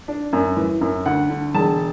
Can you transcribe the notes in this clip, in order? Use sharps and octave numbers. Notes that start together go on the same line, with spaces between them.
D4
F#2
E3
F#2
D2 F#5
D3
E1 A5